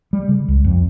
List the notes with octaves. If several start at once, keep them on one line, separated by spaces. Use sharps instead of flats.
G3
C#3
C#2
F2